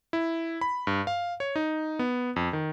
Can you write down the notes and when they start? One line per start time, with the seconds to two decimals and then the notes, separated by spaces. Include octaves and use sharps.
0.13 E4
0.61 B5
0.87 G2
1.07 F5
1.40 C#5
1.56 D#4
1.99 B3
2.36 F2
2.53 D#3